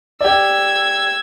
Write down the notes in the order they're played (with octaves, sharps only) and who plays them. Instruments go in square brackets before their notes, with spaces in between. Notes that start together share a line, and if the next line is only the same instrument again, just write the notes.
[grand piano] G4 D5 [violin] E6 G#6